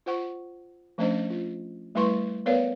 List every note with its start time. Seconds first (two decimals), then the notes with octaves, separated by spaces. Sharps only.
0.06 F4 C5 F#5 C#6
0.98 F3 A3 C#4 D4 C5 D#5
1.30 F4
1.95 G3 A3 E4 B4 C6 C#6
2.46 B3 A#4 B4 C#5 D5 F5